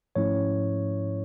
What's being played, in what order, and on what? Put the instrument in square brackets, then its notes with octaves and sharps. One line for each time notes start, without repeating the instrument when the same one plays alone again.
[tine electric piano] G#2 F3 A3 C#4 E4 C#5